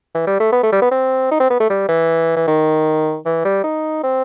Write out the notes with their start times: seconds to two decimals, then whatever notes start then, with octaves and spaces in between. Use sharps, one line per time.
0.14 E3
0.27 G3
0.40 A3
0.52 B3
0.63 A3
0.72 G3
0.82 B3
0.91 C4
1.31 D#4
1.40 C4
1.50 B3
1.60 A3
1.70 G3
1.88 E3
2.36 E3
2.47 D#3
3.25 E3
3.45 G3
3.64 D#4
4.03 C4